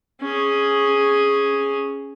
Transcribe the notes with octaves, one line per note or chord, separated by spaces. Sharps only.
C#4 G#4